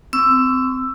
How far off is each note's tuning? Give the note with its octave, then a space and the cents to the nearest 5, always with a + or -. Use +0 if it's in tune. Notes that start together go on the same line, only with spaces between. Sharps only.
C4 -25 C#6 +15 E6 +10